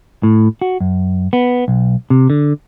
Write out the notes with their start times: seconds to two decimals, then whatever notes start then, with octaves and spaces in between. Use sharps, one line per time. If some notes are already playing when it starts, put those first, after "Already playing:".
0.23 A2
0.62 F#4
0.80 F#2
1.33 B3
1.68 B1
2.10 C3
2.30 D3